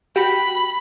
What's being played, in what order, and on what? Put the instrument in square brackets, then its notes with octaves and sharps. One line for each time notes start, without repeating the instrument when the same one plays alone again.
[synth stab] F#4 G4 G5 [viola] B5